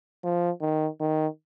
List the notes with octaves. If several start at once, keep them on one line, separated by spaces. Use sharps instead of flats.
F3
D#3
D#3